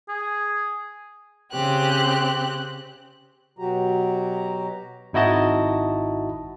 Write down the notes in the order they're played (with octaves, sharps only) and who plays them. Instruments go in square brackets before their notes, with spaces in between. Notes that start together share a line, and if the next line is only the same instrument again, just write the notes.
[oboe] G#4
[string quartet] C#3 C4 G4 F#6
[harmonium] B2 F#3 F#4 G4 A#5
[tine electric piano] G#1 D#4 E4 F#4 D#5 A5